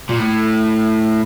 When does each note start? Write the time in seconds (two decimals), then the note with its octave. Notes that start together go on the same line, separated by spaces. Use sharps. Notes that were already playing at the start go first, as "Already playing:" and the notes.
0.09 A#2
0.19 A2